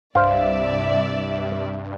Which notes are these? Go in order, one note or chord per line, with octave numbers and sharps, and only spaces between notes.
C2 G2 C5 D5 E5 F5